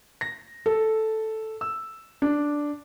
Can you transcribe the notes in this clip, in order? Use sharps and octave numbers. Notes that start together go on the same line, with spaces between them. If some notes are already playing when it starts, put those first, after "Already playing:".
A#6
A4
E6
D4